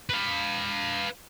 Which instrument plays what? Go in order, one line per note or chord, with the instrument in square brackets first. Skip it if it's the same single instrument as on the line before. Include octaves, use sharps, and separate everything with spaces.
[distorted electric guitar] B4 F5